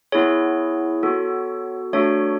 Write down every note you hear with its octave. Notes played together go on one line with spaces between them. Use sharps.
B3 E4 G#4 C#5
B3 F#4 A4
A3 D4 F#4 A4 C#5